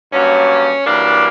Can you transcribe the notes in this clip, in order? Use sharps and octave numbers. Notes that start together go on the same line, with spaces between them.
G2 F#3 A#3 C#4
F#2 E3 G3 A#3 D4